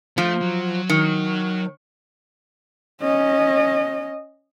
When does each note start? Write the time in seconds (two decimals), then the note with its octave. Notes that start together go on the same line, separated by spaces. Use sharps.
0.18 F3 A3
0.42 F#3
0.90 D#3
3.02 C#4 D#5